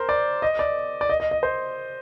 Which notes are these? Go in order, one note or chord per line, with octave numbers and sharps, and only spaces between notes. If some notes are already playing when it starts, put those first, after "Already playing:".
Already playing: A#4 C5
D5
D#5
D5
D5
D#5
D#5
D#5
C5